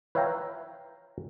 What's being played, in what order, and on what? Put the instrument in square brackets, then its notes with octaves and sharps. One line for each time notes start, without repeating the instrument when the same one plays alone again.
[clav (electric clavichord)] B4 C#5 E5 F5 G5 A#5